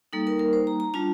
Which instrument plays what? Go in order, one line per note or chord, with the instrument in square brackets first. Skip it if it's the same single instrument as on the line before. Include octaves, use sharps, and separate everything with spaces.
[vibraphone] G3 A#3 D#4 A4
A#4
A#4
C5
A#5
A#5
G3 D4 F4 A5